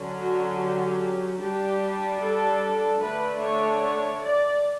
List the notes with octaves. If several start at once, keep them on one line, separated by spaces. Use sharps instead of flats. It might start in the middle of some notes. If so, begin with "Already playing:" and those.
Already playing: D3 F#3 C#4
F#4
G4
G3 D4 G4
A4
D3 A3 D4 B4
C#5
C#5
D5